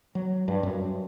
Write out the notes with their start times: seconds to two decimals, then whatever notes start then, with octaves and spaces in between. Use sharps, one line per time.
0.15 F#3
0.48 G2
0.63 F#2